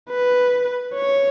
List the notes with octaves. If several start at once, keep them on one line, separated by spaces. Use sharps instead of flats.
B4
C#5